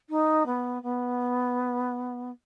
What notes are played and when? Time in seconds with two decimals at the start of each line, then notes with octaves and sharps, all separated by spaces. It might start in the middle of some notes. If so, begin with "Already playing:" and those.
0.09 D#4
0.46 B3
0.82 B3